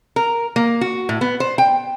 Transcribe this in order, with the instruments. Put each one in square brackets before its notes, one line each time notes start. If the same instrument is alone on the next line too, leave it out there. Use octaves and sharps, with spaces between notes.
[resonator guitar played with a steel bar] A#4
A#3
F#4
A2
B3
C5
G5